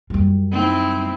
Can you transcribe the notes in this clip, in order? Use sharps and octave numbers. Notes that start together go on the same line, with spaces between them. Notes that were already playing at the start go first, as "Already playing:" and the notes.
F#2 G3
C4 D#4 E4